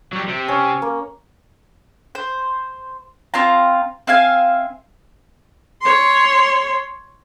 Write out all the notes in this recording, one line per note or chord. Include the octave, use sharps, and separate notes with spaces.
F#3 G3
C3 C4
C#4
A#3
C5
C4 F4 F5 A#5
C4 E5 F5 G#5
C#5 C6